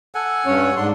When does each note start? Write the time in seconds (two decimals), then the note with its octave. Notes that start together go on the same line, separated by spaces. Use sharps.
0.15 A4 F#5 G#5
0.46 G2 C#4 C#5
0.77 G#2 D4 F#5 C6